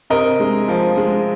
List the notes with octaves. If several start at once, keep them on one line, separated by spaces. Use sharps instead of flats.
C3 A#4 D#5
G#3
F3
G#3